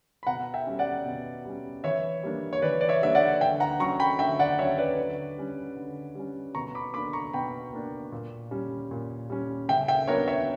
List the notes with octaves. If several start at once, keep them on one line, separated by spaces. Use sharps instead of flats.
B5
B2 F#5 A#5
E5 G5
G3 C#4
D5 F#5
B2
G3 C#4
E3 C#5 E5
G3 A#3 D4
C#5
E3 B4 D5
D5
C#5 E5
G3 A#3 D4 E5
D5 F#5
D3 E5 G5
F#5 A#5
F#3 C#4 A#5 C#6
G5 B5
D3 E5 G5
D5 F#5
F#3 C#4 C#5 E5
B4 D5
D3
G3 C#4
D3
G3 C#4
B2 A#5 C#6
B5 D6
A#3 D4 B5 D6
A#5 C#6
B2 G5 B5
A#3 D4
A#2
G3 C#4
A#2
G3 C#4
C#3 E5 G5
E5 G5
F#3 B3 D4 A#4 C#5
C#5 E5